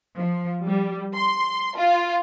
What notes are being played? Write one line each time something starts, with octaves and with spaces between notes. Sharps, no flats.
F3
G3
C6
F4